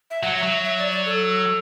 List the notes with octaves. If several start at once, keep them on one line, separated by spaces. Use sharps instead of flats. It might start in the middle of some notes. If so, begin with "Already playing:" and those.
E5
F#3 F#5
E5
F#3
E5
E5
D5
D5
A4